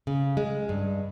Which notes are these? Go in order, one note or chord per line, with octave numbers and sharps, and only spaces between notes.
C#3
G#3
G2